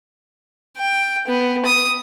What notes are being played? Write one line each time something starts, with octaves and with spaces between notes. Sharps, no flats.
G5
B3
D#6